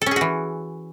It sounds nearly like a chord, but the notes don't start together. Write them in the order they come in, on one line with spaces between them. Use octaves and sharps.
A4 C#4 G#4 F#4 E3